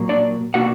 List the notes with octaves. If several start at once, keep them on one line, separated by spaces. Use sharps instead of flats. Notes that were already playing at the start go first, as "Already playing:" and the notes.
Already playing: A#2 F#3 A#3
D4 D5
B2 A#3 D4 F#4 F#5